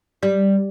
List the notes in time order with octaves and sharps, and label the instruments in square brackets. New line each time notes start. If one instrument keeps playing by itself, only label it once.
[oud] G3